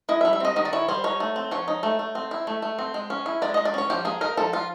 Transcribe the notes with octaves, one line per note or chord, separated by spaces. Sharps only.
E4 D#5
E5
G3
E5
C4 D#5
D#3 D#5
D5
E4 C#5
G3 C5
D#4 C#5
A3
C4
F3 C#5
D#4
A3
A3
C4
E4
A3
A3
C4
G#3
C#4
E4
G#3 D5
G#3 D#5
D5
C#4 C#5
F3 G4
A#3 G#4
D#4 A#4
F3 A4
F3 F4